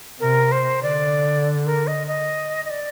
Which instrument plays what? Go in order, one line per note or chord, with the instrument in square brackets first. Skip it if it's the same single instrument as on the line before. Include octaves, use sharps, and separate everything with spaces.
[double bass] C3 [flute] A#4
[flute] C5
[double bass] D3 [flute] D5
[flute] A#4
D#5
D#5
D#5
D5